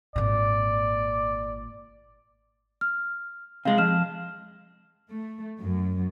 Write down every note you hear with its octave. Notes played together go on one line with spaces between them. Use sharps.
G#1 A#2 D5
F6
C3 G#3 F5
F2 F6 E7
A3
F#2